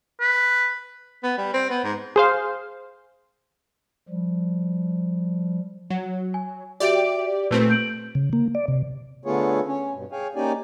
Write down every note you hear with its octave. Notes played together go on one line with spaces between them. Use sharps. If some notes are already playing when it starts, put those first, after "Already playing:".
B4
B3
G3
C4
B3
G#2
G#4 C5 F5
F3 G3
F#3
G#5
F#4 G4 D5 E5 D7
A#2 A3 C4 B4
G6 D7 F#7
C#3
A#3
D5
C3
D3 A3 B3 F4 G#4 C#5
C#4
G2 B2
G#4 C#5 F5 G5 G#5
A#3 C#4 D#4 G4 D5 G#5